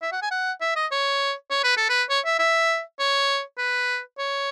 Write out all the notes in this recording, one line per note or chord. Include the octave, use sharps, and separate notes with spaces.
E5
F#5
G#5
F#5
E5
D#5
C#5
C#5
B4
A4
B4
C#5
E5
E5
C#5
B4
C#5